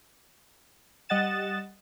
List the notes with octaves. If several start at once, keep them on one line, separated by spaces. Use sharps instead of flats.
G3 D#5 F#5 A6 E7